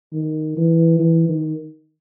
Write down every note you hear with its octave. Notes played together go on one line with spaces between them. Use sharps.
D#3
E3
E3
D#3